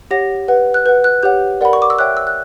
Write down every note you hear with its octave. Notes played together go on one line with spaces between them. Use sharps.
G4 C#5 F#5 A#6
B4 F#5
F#6
B4 F#5 G6
F#6
G4 C#5 F#5 G6
A#4 D5 F#5 B5
C#6
D6
E6
C#5 E5 G5 F#6
E6
F#6